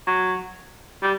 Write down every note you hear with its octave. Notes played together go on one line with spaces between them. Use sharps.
F#3
G3